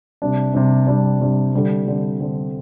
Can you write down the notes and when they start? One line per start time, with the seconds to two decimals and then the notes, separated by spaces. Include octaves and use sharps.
0.22 C3 G3 D4
0.54 C3 G3 D4
0.87 C3 G3 D4
1.20 C3 G3 D4
1.53 D3 G3 C4
1.87 D3 G3 C4
2.20 D3 G3 C4